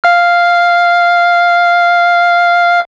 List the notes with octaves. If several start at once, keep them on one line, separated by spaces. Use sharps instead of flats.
F5 F6